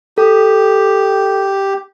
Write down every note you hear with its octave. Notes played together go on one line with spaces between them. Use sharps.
G4 A4